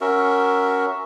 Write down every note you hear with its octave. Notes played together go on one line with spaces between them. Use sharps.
C#4 F#4 A#4 E5